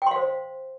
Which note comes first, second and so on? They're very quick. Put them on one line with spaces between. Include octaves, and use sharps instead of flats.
G5 C6 F5 C5